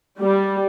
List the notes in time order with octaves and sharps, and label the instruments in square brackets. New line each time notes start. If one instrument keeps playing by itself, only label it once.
[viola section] G3